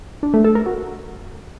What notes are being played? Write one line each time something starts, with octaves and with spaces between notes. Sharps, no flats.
D4
A3
A4
A#4
F#4